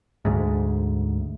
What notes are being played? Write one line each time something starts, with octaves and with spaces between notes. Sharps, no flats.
D2 G#2